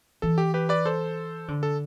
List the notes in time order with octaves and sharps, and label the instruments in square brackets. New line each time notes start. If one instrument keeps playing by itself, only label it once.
[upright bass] E3 [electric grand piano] A4
[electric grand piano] G4
G4 B4
B4 D5
A4 C5
[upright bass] D3
[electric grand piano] A4